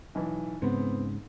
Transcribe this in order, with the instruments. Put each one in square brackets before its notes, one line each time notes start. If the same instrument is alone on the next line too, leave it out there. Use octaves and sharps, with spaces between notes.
[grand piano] B1 E3
[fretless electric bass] G#2 C#3 [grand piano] B3 C4